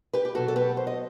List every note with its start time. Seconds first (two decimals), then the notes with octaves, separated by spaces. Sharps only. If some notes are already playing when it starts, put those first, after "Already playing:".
0.13 G4 B4
0.25 G4
0.35 B2 F#3 F#4 A4
0.48 A4
0.56 G4 B4
0.77 C5
0.87 D#5